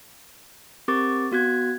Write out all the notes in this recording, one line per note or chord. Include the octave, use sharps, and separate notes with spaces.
C4 G4 A#4 C#6 D6 A6
B3 F#4 F#6 G#6